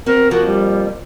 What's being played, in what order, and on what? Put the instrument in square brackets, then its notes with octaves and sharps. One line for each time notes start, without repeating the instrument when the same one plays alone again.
[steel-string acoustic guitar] B3 C4 F#4 [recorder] A#4
[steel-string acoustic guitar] F2 F3 A#3 [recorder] F#4
[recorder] G3